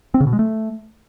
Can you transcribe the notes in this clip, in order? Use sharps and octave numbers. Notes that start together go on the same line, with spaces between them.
C4
C#3
B2
G#3
A3